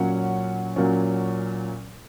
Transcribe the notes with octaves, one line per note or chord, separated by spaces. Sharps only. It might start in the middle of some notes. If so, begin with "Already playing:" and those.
Already playing: A#2 F#3 C#4 F#5
A#2 F#3 C#4